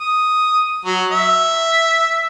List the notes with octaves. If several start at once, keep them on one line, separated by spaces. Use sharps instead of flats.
D#6
F#3
E5